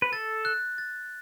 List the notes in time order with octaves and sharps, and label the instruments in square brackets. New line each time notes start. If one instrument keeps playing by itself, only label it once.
[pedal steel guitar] B4
[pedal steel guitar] A4 [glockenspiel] A6
[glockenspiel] F#6
A6